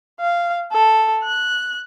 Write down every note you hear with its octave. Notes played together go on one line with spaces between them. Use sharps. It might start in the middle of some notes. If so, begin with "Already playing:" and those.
F5
A4
F#6